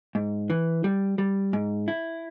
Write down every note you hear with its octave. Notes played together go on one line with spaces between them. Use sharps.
G#2
E3
G3
G3
G#2
E4